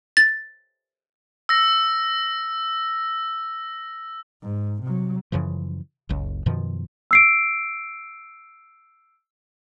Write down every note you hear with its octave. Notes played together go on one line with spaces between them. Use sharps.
A6
E6 A#6
G#2
C3 F#3
F#2 C#3 E3 F3
F#1 C#2
F#2 B2 D#3 F3
E6 C7 D7